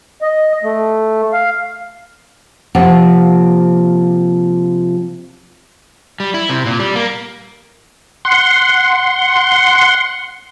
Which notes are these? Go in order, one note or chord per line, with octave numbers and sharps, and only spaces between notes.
D#5
A3
F5
C3 F3 A#3 F4 F#5
G3
E4
C3
A#2
G3
A#3
F#5 C6